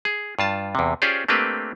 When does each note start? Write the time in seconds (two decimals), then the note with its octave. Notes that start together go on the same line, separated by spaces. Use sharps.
0.05 G#4
0.39 G2 F4 A5
0.75 E2 C3
1.02 C#4 F4 G4 G#4 C5 D5
1.28 A3 A#3 C4 D4 G4 B4